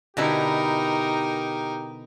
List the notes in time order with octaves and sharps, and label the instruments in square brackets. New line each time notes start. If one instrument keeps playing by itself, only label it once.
[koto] B2 D3 E4 [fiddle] D#4 A#4 [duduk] G4